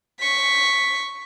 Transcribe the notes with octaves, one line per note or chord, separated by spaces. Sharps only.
C#6 B6